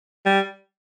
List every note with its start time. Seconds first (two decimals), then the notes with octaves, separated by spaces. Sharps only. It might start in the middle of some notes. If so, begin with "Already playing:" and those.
0.26 G3